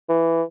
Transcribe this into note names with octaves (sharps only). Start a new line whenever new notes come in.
E3